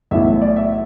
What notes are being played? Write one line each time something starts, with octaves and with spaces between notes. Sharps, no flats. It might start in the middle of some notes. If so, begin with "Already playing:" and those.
B1 A2 E3 E5
E5
D5
E5